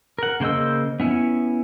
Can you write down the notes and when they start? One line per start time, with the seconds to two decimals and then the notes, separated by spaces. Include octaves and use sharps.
0.19 A#4 F#5
0.40 C#3 A#3 C5 D#5 E6
1.00 B3 C#4 E4